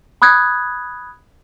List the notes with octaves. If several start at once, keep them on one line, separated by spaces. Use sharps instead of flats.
B5 D#6 F#6 G#6